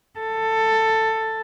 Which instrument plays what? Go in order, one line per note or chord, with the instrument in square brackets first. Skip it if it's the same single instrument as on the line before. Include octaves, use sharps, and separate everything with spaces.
[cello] A4